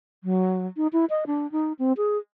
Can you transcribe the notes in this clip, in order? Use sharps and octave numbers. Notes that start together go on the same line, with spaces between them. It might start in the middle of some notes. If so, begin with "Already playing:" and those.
F#3
D#4
E4
D#5
D4
D#4
C4
G#4